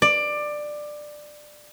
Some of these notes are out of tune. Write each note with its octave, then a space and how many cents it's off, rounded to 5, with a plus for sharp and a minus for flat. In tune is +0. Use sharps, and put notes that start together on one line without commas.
D5 +15